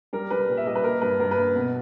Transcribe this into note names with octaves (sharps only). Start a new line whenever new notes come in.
G3 A#4
G3 B4
A#2
E5
G3 D#5
B4
A#3 A#4
G2 B4
G2 A#4
B4
A#3
B2